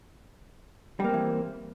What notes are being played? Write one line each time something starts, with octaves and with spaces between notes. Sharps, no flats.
E3 G3 A#3 C4